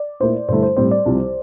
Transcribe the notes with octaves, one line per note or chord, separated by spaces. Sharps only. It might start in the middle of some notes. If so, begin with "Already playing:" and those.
Already playing: D5
A#2 A3 E4 A#4 C5
G2 D3 A3 E4 C5
C5
A2 G3 C4 C5
D5
C2 C3 F3